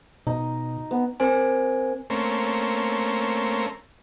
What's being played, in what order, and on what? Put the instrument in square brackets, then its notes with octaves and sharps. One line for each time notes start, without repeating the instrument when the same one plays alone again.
[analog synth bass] B2 [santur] D#4
[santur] B3
[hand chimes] C4 A#4 C5 G#5
[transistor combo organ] A3 A#3 C4 C#4